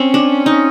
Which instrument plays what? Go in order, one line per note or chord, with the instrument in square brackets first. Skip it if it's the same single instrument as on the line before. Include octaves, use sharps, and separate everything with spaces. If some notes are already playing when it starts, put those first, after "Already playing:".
Already playing: [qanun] C4 [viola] C#4
[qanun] D4
D#4